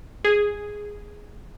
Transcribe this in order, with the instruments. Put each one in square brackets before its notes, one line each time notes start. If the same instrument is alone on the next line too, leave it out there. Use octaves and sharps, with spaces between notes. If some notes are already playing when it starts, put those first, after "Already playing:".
[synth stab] G#4